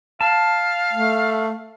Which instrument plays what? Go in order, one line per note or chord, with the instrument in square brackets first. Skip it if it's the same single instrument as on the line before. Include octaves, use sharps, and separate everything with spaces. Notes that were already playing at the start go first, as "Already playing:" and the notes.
[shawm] F5 [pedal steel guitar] A5
[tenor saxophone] A3